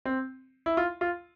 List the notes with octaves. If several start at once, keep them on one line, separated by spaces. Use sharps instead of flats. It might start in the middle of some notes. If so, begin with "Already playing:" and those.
C4
E4
F4
F4